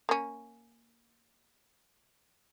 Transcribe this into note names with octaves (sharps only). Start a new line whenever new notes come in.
A#3 C#4